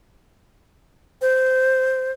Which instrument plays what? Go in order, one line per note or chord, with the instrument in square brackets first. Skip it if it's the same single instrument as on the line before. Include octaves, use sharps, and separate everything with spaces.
[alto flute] C5